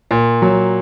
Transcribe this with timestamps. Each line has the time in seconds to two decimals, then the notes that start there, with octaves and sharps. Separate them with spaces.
0.11 A#2
0.42 F#3